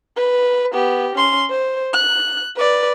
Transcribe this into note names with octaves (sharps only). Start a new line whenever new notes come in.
B4
B3 G4
C#4 C6
C5
F#6
B4 D5